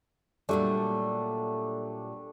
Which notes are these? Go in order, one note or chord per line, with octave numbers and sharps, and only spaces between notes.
A#2 F#3 G3 A3 D4